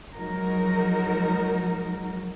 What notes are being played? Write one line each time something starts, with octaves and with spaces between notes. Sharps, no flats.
F3 F#3 G#3 D#4 F#4 A#4